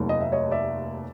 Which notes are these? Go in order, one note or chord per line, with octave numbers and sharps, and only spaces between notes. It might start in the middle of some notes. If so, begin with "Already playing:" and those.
Already playing: F1 D#2 D#3 F#3 A3
D#5
E5
C#5 D#5
D5 E5